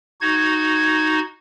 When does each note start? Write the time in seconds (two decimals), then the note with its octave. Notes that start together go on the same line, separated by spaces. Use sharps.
0.21 D#4 F#4 G#6